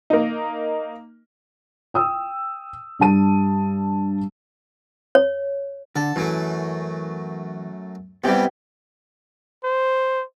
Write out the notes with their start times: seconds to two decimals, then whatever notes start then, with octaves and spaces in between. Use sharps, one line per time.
0.10 A#3 D#4
1.94 G5 D#6 E6
2.99 G2 G3 A5 D#7
5.15 C#5
5.96 D3 A4
6.16 F#2 E3 F#3 A3
8.24 C3 E3 G3 B3 G4
9.64 C5